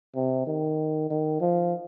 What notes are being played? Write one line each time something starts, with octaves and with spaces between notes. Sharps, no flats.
C3
D#3
D#3
F3